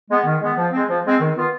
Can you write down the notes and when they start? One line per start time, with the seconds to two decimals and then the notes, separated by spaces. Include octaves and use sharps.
0.09 G#3 B3
0.25 D#3
0.41 G#3 B3
0.57 F3
0.72 G#3 C4
0.88 F3
1.05 G#3 C4
1.20 D#3
1.36 B3 F4